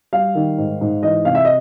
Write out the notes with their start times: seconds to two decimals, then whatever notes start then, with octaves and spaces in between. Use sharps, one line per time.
0.13 G3 F5
0.35 D#3
0.58 G#2
0.81 G#2
1.03 E3 D#5
1.25 C3 F5
1.35 E5
1.45 D#5